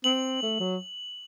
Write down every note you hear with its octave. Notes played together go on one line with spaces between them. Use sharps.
C4 F#7
A3
F#3